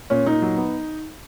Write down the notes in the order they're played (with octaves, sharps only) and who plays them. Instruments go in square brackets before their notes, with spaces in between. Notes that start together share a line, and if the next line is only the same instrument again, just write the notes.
[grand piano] A#2 [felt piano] C#4
[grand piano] A#2 [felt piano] D#4
[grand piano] F#3
B3